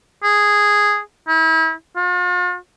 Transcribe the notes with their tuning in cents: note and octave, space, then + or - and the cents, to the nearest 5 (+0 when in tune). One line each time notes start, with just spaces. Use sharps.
G#4 -5
E4 -35
F4 +45